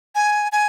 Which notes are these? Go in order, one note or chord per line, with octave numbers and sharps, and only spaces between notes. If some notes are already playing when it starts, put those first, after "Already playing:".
G#5
G#5